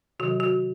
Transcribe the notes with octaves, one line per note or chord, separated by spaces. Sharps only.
C3 D#3 F#3 F#4
F#4